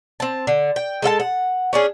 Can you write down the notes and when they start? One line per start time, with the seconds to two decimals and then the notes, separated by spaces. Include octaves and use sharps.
0.20 C4 A5
0.47 D3
0.76 G5
1.02 G#3 A4 F5 A5
1.20 F#5
1.73 C#4 D4 G#4